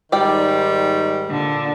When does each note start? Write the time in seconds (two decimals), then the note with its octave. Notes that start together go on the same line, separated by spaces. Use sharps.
0.12 G#2 D#3 G3 D5 G5
1.29 A#2 D3